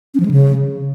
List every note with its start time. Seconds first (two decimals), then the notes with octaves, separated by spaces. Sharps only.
0.14 C#4
0.20 F3
0.25 G#3
0.31 C#3